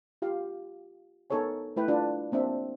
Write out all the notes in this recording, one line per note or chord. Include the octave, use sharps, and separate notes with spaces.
F4 G4 F5
B3 D#4 A4 A#4 C#5 G#5
A3 E4 B4 G5
D4 F4 B4
A#3 C4 D4 E5